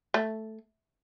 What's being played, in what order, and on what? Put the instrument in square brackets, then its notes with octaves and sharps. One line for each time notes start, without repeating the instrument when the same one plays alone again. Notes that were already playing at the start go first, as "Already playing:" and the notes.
[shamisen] A3